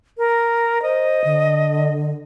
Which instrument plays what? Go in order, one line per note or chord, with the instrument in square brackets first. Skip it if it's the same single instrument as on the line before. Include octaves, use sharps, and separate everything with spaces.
[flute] A#4
[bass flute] C5 [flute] D#5
[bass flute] D3